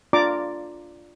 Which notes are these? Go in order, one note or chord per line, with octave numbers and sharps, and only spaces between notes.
D4 F4 D5 A#5 D6